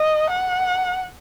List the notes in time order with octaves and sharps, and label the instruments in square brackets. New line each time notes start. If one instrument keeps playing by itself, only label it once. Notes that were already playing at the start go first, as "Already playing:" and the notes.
Already playing: [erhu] D#5
F#5